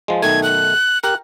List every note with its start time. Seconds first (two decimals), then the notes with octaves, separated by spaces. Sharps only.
0.08 F3 G#3
0.22 B1 D#3 A3 G#6
0.43 F#6
1.04 G4 A#4 F#6